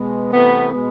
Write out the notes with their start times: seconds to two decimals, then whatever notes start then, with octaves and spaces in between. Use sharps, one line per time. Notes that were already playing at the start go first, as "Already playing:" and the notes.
Already playing: B2 G#3 B3
0.33 C3 E3 A3 B3
0.72 B2 G#3 B3